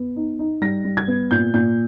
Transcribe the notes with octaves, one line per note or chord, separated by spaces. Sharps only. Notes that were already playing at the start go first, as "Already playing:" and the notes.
Already playing: B3
D#4
D#4
G3 A#6
G3
G#6
B3
A#2 G6
A#2 G6